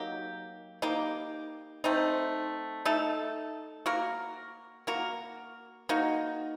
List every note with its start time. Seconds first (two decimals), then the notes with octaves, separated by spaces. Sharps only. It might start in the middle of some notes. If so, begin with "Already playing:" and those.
Already playing: F#3 A#3 D#4 G4
0.82 A#3 D#4 G4
1.84 A3 C4 D#4
2.85 A3 D#4 A4
3.86 A#3 F#4 A#4
4.87 A#3 F#4 A#4
5.89 A#3 D#4 F#4